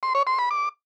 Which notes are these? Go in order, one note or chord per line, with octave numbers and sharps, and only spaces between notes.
C6
C#5
C6
B5
D6